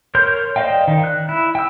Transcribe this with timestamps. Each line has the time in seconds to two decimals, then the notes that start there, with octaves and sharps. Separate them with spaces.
0.15 A#4 C#5 C6 G6
0.56 C5 D5 D#5 F5 G5
0.88 D#3
1.04 F#6
1.29 E4
1.55 G5 E6